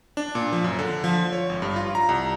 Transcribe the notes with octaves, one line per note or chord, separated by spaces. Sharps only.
D4
A#2
F3
F#2
D3
F3
C#5
G#1
G2
F4
A#5
C2